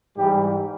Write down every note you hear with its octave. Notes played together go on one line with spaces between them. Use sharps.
G#2 E3 G3 G4